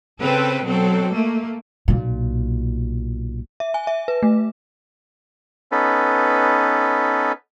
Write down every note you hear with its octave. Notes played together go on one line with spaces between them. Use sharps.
C#3 C4 A4 B4
B2 F#3 C4 A4
A3 A#3
B1 A#2
E5
G#5
E5
B4
A3
B3 C#4 D#4 A4 B4